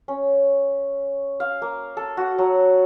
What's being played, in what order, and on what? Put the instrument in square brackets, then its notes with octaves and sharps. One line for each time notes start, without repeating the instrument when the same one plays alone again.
[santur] C#4
F5
A#3
A4
F#4
F#3